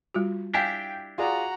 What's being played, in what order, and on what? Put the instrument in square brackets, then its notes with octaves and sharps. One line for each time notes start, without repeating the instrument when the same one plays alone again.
[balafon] G3 F4 F#4
[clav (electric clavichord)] D4 E4 G4 [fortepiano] F5 G5 G#5
[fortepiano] F4 G#4 D5 [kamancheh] F#4 A#5